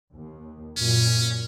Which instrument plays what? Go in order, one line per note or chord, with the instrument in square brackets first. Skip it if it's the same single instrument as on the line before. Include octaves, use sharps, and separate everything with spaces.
[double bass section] D#2
[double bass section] F#2 A#2 [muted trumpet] C#4